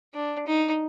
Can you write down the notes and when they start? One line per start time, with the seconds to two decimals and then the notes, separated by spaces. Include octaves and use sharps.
0.14 D4
0.47 D#4